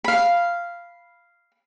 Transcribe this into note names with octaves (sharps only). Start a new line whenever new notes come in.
F5 B5